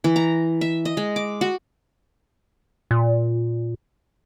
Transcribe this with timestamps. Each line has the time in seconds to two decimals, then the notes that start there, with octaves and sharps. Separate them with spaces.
0.04 E3
0.16 A#5
0.61 E5
0.85 D#5
0.97 G#3
1.16 D6
1.41 F#4
2.91 A#2